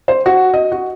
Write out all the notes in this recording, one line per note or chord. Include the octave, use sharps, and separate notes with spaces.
C5
F#4
D#5
F#4